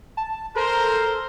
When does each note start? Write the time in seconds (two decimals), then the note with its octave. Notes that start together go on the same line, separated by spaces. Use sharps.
0.17 A5
0.56 A4 A#4 C5